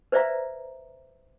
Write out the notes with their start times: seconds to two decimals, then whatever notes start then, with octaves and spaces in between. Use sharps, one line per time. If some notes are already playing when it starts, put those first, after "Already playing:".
0.12 B4 C5 D5 E5 F5 A#5